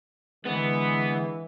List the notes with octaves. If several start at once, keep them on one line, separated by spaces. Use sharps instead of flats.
D3 E3 G#3 B3